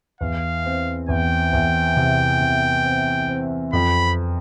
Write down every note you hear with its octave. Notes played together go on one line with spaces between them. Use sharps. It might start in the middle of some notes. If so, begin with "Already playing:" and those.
E2 F5
C4
E2 G5
E2
C3
C3
C4
C4
F2 B5